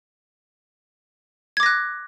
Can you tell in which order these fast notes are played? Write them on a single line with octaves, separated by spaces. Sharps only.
G#6 D6 A#6 F#6